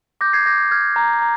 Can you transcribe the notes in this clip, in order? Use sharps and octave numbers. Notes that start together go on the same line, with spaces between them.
D6 G6 A#6
G#6 C7
D6 G6 A#6
F6 G#6
A#5
A#5